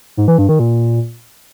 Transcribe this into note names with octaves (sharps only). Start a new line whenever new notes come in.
G#2
E3
G2
D#3
A#2